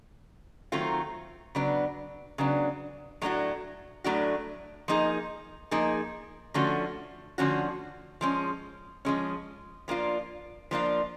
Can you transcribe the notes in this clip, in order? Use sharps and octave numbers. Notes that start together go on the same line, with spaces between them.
D#3 F#3 A3 C4 F4
C#3 F#3 B3 D4
C#3 F#3 B3 D4
A2 F#3 A3 D4 F#4
A2 F#3 A3 D4 F#4
F3 A#3 D#4 G#4
F3 A#3 D#4 G#4
D3 F3 A3 C#4 F#4
D3 F3 A3 C#4 F#4
F3 G#3 C#4
F3 G#3 C#4
F3 A#3 D4 F4
F3 A#3 D4 F4